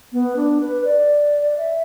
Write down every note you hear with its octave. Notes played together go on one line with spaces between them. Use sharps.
B3
D4
B4
D5
E5